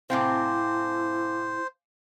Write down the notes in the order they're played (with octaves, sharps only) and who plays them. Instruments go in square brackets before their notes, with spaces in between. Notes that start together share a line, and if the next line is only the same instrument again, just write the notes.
[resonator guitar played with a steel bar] A2 C3 C4 [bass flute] E4 [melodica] C5 [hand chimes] F5 G#5 D6